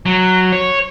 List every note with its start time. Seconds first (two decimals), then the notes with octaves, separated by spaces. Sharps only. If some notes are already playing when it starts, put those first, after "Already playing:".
0.06 F#3
0.52 C#5